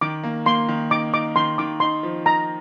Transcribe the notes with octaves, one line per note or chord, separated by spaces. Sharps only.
D#3 D6
A#3
A#3 C6
D#3
D#4 D6
D#4 D6
D#3 C6
D#3 D6
D#4 C6
F3
D#4 A#5